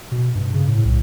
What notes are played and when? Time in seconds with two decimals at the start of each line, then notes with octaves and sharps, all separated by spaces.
0.12 B2
0.35 G2
0.54 C#3
0.68 A2
0.85 C2